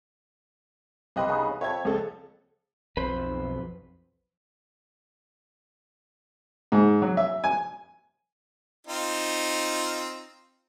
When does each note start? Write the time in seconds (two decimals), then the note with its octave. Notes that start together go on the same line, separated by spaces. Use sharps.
1.16 C2 C4 G4 B4 D#5 F#6
1.29 C#3 B3 D#4
1.61 F2 C#5 E5 G#6
1.85 C#2 G#4 A4
2.97 B1 F2 B4 C5
6.72 G#2
7.02 F#3
7.17 E5
7.44 G#5
8.87 C4 D#4 F4